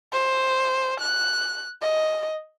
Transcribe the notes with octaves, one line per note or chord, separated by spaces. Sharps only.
C5
F#6
D#5